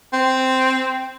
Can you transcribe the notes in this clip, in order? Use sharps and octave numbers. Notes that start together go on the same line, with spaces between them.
C4